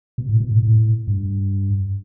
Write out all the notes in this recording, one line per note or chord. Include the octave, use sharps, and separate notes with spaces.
B2
A2
B2
A2
A2
G2